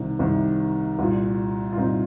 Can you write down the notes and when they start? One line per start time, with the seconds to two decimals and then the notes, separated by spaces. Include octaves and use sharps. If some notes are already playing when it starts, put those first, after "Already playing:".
Already playing: C2 C3 D#3 D#4
0.19 C2 C3 D#3
0.99 C2 A#2
1.73 F4
1.77 C2 A#2 C4 D#4